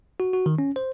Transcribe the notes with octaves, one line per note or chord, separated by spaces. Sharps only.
F#4
F#4
D#3
C#4
C5